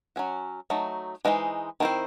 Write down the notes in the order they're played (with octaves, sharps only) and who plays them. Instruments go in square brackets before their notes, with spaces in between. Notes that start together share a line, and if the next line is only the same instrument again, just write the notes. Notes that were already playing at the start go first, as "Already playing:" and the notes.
[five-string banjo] F#3 C#4 F#4
F#3 A3 D#4
E3 G#3 D#4 F#4 C5
D#3 A3 C4 E4 C5